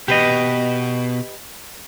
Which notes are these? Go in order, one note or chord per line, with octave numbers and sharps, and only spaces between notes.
B2 G4 B4 D#5